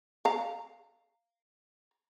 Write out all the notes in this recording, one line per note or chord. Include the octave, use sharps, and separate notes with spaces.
F5 A#5